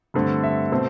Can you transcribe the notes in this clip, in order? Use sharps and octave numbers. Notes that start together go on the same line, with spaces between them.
G2 D3 A3 C4
E5
B2 A3 C4